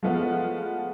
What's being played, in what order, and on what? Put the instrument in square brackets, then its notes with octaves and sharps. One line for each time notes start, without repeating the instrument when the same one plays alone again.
[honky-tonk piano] F3 G#3 A3 B3 F4